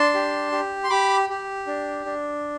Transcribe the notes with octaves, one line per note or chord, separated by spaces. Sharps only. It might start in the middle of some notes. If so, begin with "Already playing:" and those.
Already playing: D4 A5 C6
G4
G4
C6
G4 B5 D6
G4
D4
D4